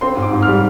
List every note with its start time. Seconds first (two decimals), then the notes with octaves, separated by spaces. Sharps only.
0.01 C4 C6
0.17 G#2
0.22 D6
0.33 G#2
0.42 F6
0.48 G3